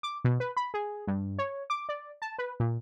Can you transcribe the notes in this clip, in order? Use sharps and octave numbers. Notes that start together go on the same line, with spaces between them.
D6
B2
B4
B5
G#4
G2
C#5
D6
D5
A5
B4
A#2